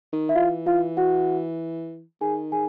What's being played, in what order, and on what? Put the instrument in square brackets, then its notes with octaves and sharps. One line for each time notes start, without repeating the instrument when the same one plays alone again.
[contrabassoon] D#3
[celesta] E5
[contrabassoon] E3 [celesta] F4 F5
[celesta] F4 F5
F#4 F#5
[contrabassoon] D#3 [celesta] G#4 G#5
[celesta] G#4 G#5